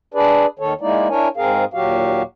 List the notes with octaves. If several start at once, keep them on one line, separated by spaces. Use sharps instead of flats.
D4 G#4 B4 D5
D#2 D#3 A4 C#5
G#3 A#3 D#4 E4 D5
D4 E4 A#4 C#5 G#5
G#2 C4 G#4 A#4 F5
D#2 A#2 F#3 F#4 G4 F5